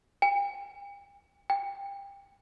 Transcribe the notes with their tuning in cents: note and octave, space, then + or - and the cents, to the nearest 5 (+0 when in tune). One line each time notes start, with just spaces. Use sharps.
G5 +45
G5 +25